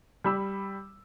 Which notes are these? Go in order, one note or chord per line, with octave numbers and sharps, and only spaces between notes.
G3 B5 E6